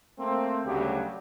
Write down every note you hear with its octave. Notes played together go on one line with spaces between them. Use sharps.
A3 A#3 C4
D2 C#3 F#3 G3 G4